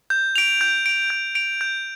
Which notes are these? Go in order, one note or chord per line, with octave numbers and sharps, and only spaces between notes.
G6
D7 F7
G6
D7 F7
G6
D7 F7
G6